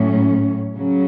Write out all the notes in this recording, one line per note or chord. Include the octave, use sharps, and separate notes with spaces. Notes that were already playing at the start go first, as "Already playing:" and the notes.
Already playing: A2 F#3 C#4
C#3 F#3 C#4